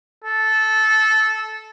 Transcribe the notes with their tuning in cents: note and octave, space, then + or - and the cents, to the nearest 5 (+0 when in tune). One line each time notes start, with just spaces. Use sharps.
A4 -15